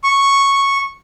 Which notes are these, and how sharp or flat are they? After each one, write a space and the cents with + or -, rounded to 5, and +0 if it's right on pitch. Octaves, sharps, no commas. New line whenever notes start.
C#6 -5